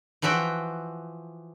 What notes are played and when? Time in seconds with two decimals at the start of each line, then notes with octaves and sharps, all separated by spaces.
0.22 E3 F3 F#4 E5 G5